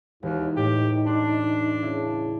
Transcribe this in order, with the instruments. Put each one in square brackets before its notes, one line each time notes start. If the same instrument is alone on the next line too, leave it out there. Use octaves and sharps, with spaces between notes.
[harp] E1 [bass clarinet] D#2 [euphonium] D#4
[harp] A2 [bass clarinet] G4
[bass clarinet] D4 [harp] C6 C7
[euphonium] C#3 [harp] E4